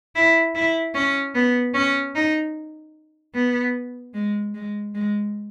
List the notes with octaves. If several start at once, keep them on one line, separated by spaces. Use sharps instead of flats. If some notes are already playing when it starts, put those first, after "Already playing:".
E4
E4
C#4
B3
C#4
D#4
B3
G#3
G#3
G#3